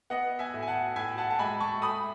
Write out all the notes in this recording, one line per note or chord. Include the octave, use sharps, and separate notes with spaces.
B3 D#5 F#5
E5 G#5
A2
G#5
F#5 A5
A2 E5 G#5
F#5 A5
A5
G#3 G#5 B5
A5 C#6
A3 B5 D#6